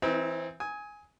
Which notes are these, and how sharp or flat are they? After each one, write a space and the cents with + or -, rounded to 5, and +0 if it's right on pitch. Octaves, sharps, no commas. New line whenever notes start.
E3 +0 C4 +0 D#4 +45
G#5 +0 D#6 +35